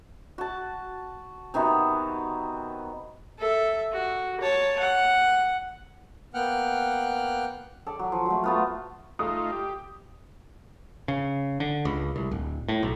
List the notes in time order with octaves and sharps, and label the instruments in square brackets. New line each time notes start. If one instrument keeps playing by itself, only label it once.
[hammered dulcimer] F#4 A5
C3 D#3 B3 F#4
[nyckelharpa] A4 E5
F#4
C#5 A5
F#5
[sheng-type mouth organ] A#3 B3 F#5 G5 F6 F#6
[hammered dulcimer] A4 D5
F#3
F3
F#3 A3
A3 B3 F4
[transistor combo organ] A3 D#4 F4 [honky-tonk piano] D#6
[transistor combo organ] G4
[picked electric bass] C#3
D3
C#2
C2
D1
A2
B1